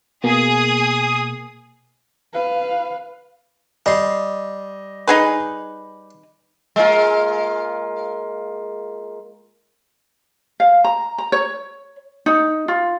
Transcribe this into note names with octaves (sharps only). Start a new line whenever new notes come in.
B2 A#3 G#4 D#6
B4 F5
G3 D#5 C6
D#4 G#4 B4
G#3 A#3 F4
F5
A#5
A#5
C#5
D#4
F4